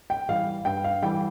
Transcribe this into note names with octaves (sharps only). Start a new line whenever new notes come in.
G5
E3 G3 F5
G2 G5
F5
E3 G3 G5